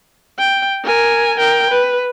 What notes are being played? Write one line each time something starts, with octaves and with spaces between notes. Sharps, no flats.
G5
A#4 G#5
A#4 G5
B4